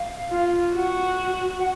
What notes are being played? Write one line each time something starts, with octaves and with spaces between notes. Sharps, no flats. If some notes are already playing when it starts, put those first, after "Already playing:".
Already playing: F5
F4
F#4 F#5
F#5